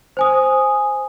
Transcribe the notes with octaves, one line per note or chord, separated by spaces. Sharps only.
C5 G#5 D#6